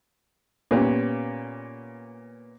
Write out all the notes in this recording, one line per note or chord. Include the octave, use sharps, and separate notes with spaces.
A#2 B3 C#4 G4